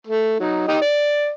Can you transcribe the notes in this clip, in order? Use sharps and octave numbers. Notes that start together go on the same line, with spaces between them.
A3
F#3 D#4
D#4 G4 D#5
D5